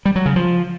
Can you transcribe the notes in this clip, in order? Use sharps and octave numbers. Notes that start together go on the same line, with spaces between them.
G3
F#3
C#3
F3